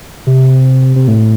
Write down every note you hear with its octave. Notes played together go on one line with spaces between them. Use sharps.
C3
C3
A2